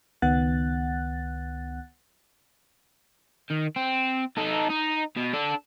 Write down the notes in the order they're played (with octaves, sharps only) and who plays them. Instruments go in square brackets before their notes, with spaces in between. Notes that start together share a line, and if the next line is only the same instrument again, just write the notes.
[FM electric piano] C#2 D#3 B3 F#5 F#6 A6
[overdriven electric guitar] D#3
C4
D#4 A4
D#4
B2
D4 A4